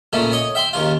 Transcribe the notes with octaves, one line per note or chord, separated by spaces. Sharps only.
A#2 C#3 A3 C#4
C#5 D#5
E5 G5 C6
D#2 C#3 F4